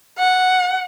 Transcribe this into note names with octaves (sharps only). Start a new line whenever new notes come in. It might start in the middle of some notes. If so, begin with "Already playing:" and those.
F#5